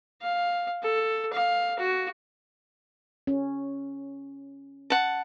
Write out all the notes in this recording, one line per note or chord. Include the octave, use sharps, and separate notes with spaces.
F5
A4
F5
F#4
C#4
F#5 A5